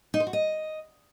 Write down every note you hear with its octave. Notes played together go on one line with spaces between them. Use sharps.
D#4
C5
F#4
D#5